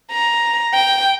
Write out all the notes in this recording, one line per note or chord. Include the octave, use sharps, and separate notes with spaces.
A#5
G5